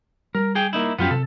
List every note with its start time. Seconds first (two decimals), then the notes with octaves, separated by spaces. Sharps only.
0.35 G3 A#4
0.55 G#4 G5
0.73 A#3 D#4 E4
0.99 F#2 F#3 B3 C#4 F4 G4
1.11 C3 A4